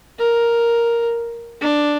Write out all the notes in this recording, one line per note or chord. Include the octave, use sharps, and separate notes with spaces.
A#4
D4